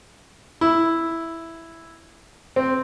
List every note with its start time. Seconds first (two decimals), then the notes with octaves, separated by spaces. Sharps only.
0.61 E4
2.56 C4